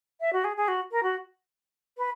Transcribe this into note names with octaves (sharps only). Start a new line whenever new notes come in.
E5
F#4
G#4
G#4
F#4
A#4
F#4
B4